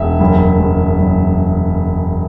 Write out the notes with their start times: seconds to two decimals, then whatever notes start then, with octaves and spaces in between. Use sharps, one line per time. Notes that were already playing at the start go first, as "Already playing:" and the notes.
Already playing: E1 E5
0.20 F#1
0.60 F#1
0.99 F#1